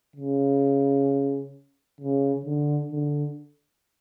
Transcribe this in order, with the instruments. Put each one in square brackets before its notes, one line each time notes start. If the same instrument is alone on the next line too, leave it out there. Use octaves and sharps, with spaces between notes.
[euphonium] C#3
C#3
D3
D3